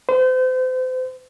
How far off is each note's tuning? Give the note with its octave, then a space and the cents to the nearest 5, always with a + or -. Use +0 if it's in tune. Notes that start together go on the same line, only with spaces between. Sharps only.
C5 -35